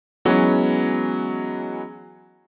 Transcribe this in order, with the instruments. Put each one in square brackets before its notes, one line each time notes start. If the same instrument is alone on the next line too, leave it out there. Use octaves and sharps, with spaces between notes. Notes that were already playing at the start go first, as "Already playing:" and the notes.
[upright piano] E3 F#3 G#3 B3 C#4